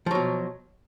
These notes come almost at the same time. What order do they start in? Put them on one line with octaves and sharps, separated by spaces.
F3 F#3 B2